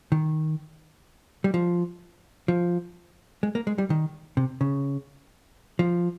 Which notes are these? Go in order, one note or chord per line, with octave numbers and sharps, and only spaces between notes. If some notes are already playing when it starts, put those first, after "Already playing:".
D#3
G3
F3
F3
G#3
A#3
G#3
G3
D#3
C3
C#3
F3